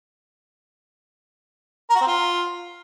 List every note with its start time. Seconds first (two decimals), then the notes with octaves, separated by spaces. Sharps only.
1.90 A#4
1.95 F#4
2.01 C4
2.07 F4